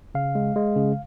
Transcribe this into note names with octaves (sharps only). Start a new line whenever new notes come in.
C#3 F5
G#3
G#3
C#3